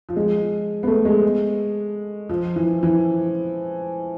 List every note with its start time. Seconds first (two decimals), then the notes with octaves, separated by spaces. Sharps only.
0.09 F3
0.16 G#3
0.83 B3
0.87 A3
1.05 G#3
2.29 F3
2.56 E3
2.83 E3